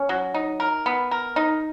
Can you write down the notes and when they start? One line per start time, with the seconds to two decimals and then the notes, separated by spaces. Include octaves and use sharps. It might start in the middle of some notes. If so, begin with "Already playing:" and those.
Already playing: C#4
0.09 F#3
0.34 D#4
0.60 A#4
0.86 B3
1.11 A#4
1.36 D#4